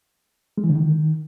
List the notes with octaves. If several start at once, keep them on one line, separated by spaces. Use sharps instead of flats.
G#3
E3
D3
D#3